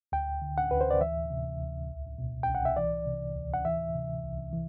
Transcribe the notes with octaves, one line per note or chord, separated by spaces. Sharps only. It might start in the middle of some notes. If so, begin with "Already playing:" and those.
D2 G5
D3
F#5
D2 B4
C5
D5
E3 E5
C3
D2
C2
B2
C2 G5
F#5
E5
E3 D5
C3
D2
F#5
E3 E5
C3
C2
E3